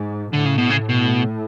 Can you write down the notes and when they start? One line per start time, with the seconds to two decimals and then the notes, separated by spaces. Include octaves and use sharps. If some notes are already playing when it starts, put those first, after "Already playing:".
Already playing: G#2
0.33 A2 D3
0.46 C#3
0.58 B2
0.70 C#3
0.89 B2